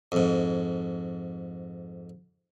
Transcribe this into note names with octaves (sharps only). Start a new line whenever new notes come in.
F2 G#2